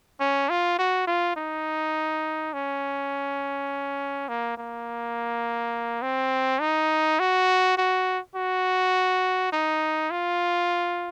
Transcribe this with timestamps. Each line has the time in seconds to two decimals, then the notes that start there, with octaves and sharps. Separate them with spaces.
0.20 C#4
0.50 F4
0.79 F#4
1.07 F4
1.37 D#4
2.53 C#4
4.29 A#3
4.58 A#3
6.02 C4
6.61 D#4
7.20 F#4
7.77 F#4
8.36 F#4
9.52 D#4
10.11 F4